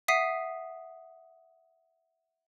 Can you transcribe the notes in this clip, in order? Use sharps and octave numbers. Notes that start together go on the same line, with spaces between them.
E5 F#5 D#6 B6 C7 D#7